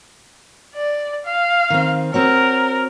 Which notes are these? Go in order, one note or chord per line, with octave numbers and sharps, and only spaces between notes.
D5
F5
D#3 C4
C4 F#4 A#4 C#5